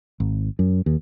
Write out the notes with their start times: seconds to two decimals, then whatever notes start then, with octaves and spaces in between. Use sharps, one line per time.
0.20 G#1
0.59 F#2
0.86 D#2